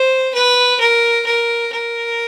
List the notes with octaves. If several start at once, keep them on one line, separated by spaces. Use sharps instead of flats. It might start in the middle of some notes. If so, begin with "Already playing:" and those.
Already playing: C5
B4
A#4
A#4
A#4